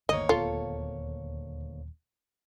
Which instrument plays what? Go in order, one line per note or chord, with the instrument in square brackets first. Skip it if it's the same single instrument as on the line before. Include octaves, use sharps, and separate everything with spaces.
[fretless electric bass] G1 D#3 [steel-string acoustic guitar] D2 A#3 C#5 [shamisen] D#5
[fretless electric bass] D#1 B3 [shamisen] F4 [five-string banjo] A4